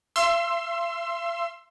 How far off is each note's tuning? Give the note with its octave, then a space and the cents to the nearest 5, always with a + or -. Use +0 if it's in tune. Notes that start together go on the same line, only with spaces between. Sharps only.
F5 -45 C6 +10 E6 +25